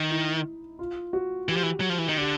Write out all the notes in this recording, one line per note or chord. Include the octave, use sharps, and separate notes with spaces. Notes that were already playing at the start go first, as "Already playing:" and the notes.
Already playing: D#3 D#4
E4
F4
F#4
E3 G4
F3
E3
F#3
F3
E3
D#3
D3 G4